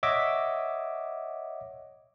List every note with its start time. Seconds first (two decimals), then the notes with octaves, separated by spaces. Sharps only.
0.03 C#5 D#5 E5 F#5 D6 E6